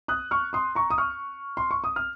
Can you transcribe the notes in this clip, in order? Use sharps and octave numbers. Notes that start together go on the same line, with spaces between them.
D#6 F#6
C#6 F6
C6 D#6
A#5 C#6
D#6
C#6 F6
C6
C#6
D#6
F6